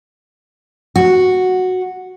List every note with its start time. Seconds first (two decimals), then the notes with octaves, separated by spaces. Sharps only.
0.96 F#4